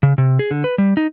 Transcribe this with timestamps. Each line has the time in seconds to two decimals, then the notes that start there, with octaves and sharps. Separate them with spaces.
0.03 C#3
0.18 C3
0.39 G#4
0.51 D3
0.64 B4
0.78 G3
0.97 D#4